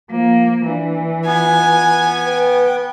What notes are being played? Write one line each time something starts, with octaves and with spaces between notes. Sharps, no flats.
F3 A#3
E3 D4
B3 F4 G#5
B4 G5